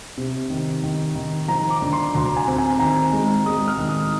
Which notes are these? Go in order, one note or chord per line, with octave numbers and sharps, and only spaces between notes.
C3
D#3
D#3
D#3
F3 A#5
D6
D3
C6
D2 A#5
G#5
C4
G#5
D#3 A#5
G#3
G#3 D#6
F6
D#3
D#6